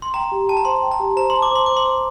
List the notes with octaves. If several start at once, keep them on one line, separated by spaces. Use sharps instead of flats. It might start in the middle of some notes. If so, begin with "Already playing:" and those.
C6
G5 A#5
G4
G5 A5
A#5
C5 C6
G5
A#5
G4
C5 A#5
C6
A5
D6
C5 C6
C5 D6
C6
C5